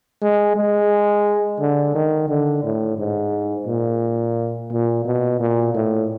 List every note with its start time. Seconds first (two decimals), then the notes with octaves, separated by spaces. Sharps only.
0.22 G#3
0.56 G#3
1.60 D3
1.95 D#3
2.28 D3
2.64 A2
2.98 G#2
3.67 A#2
4.71 A#2
5.05 B2
5.40 A#2
5.74 A2